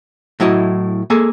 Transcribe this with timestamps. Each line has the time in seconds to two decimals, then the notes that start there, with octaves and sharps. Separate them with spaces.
0.40 A2 F#3 E4 D#5
1.10 A#3 G#4 A4